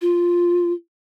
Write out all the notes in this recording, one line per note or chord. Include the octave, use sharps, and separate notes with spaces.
F4